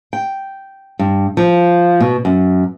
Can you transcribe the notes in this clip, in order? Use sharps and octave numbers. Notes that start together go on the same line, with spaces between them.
G5
G2
F3
B2
F#2